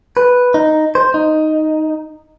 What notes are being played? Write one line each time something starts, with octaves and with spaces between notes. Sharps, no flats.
B4
D#4
C5
D#4